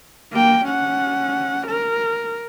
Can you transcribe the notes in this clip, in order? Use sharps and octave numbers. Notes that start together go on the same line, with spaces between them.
A#3 G5
C#4 F#5
A#4